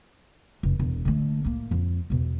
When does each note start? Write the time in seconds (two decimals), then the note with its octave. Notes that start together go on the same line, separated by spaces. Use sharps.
0.63 F1
0.79 E1
1.05 D3 A3
1.45 A2 A#3
1.71 F2
2.10 E2 B2